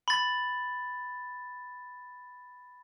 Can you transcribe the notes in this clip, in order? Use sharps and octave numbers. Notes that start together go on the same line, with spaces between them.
B5 A6